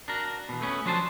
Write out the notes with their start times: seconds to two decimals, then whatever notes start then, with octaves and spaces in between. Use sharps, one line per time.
0.08 D4 F#4 A#4
0.49 E2 B2
0.61 A3 B3 C#4
0.85 F3 F#3 D4 C5 G#5 A5